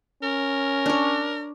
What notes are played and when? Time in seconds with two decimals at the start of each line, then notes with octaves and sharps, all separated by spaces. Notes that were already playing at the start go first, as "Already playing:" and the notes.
0.23 C#4 A#4
0.86 D4 C#5